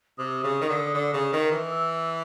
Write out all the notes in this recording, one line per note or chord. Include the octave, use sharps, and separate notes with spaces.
C3 D#6
C#3
D#3
D3
D3
C#3
D#3
E3
E6